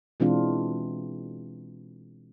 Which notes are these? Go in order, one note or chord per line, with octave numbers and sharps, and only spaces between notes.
B2 E3 G#3 C4 D4 F4